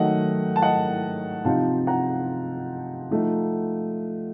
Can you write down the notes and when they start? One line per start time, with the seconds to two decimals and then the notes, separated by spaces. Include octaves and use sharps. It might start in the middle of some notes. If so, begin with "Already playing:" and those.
Already playing: D#3 F#3 A3 D#5 F#5
0.56 A5
0.62 D#5 F#5
1.45 C3 F3 C4 D#4 F5 A5
1.87 F#5 A#5
3.11 F3 A3 D#4